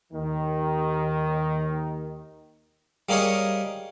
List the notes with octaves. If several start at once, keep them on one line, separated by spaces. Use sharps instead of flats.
D#2 D#3
G3 A#3 G#4 A#4 C#5 D#5